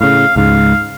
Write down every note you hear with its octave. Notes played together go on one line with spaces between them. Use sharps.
A2 C#3 F5
C#2 G#2 F5